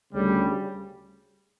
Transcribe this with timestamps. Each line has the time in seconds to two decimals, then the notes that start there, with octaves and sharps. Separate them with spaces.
0.13 D2 C#3 G3